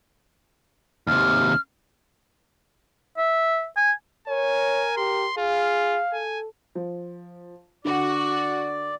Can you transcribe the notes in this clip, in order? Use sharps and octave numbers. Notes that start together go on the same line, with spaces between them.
D#2 C3 F6
E5
G#5
A#4 C#5 G#5
G4 C6
F4 G#4 F5
A4 G#5
F3
D3 F#4 D5